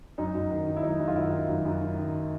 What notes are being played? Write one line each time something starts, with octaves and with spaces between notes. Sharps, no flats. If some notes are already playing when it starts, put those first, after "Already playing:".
F#2 D#4
F#2
D#3
D#3
E4
F#2 D#4
F#2
F4
D#3 E4
D#3
F#2
F#2
D#3
D#3